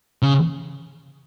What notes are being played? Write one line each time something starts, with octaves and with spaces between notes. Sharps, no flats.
C#3